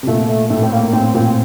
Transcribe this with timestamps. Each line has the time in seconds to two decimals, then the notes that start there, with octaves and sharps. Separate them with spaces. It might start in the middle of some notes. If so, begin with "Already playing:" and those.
0.03 C3
0.07 A#2 A3
0.29 A3
0.50 A2 A3
0.63 C4
0.72 A#3
0.93 A2 C4
1.15 A#2 C4